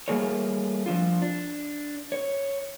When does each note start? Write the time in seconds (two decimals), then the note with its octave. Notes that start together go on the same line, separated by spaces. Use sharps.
0.08 G3 A3 A#3 G#4 A#4 C#5
0.86 F3 D4 F4
1.22 D4
2.12 C#5